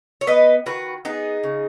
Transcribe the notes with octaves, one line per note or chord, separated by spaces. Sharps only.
C#5
B3 B4 D#5
D#3 F#4 B4
B3 D#4 G#4
C#3